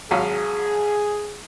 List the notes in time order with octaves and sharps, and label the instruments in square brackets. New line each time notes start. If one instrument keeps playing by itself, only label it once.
[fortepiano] G#1 F#3 F5 [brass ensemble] G#4